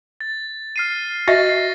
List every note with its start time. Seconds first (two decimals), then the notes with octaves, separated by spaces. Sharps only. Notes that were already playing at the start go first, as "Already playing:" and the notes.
0.21 A6
0.76 F6 C7 D#7
1.28 F#4 D#5 E5 A6 A#6
1.49 C7